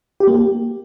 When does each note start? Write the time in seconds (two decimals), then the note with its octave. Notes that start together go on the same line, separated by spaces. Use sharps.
0.20 G4
0.27 A#3
0.35 G4